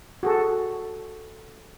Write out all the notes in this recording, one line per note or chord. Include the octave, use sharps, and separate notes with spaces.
F#4 G#4 A4